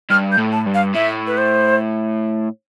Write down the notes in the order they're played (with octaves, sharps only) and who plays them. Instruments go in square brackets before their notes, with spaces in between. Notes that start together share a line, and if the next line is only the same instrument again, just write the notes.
[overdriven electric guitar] G2 [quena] F6
[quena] G6
[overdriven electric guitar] A2
[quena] A5
[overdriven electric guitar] G2
[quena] F5
[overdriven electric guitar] A2 [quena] E5
[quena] B4
C5